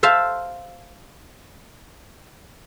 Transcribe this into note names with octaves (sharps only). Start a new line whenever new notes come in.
C5 E5 F5 A5